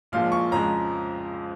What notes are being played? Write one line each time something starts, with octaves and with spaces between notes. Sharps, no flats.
A#1 A#2 F3 G#3 F5
C#6
F2 C#3 F3 G#3 A#5